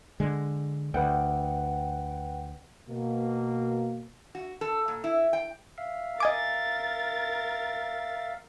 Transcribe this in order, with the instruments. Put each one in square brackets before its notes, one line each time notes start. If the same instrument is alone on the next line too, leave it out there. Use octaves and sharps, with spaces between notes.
[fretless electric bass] D3 G#3
[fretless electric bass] D2 [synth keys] B4 F#5 G5
[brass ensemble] B2 A#3
[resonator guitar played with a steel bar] F#4
A4
A#2
E4
G5
[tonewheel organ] E5 F5
[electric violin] A#4 A6 [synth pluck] D#5 G#5 D6